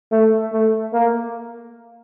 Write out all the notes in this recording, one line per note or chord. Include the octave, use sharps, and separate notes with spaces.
A3
A3
A#3